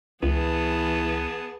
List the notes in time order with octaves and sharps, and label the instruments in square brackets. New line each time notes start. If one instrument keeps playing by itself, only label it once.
[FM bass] C#2 [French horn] E3 [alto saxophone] B3 [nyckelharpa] G#4 A5